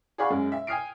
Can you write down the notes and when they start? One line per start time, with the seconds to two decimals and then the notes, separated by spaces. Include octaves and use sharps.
0.18 G#4 D5 F5 F#5 B5 C#6
0.30 F#2 G#3
0.52 E5
0.67 G5 G#5 D#6 F6 C7 D7